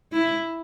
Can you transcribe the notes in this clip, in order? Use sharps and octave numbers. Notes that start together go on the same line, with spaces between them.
E4